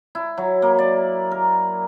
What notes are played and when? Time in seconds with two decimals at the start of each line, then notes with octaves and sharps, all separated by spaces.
0.15 E4
0.38 F#3
0.62 A#3
0.79 D5
1.31 A#4